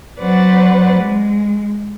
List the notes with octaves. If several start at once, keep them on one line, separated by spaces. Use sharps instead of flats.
F#3 C4 B4 C5 D5 F#5
G#3